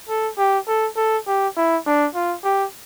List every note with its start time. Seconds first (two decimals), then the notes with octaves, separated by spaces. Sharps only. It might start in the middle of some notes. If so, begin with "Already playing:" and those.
0.09 A4
0.38 G4
0.67 A4
0.97 A4
1.27 G4
1.57 E4
1.86 D4
2.15 F4
2.44 G4